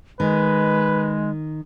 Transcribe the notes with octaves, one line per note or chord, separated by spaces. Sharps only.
D#3 G#3 B4